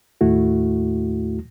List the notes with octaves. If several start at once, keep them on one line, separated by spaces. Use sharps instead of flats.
D#2 A2 A3 E4 F#4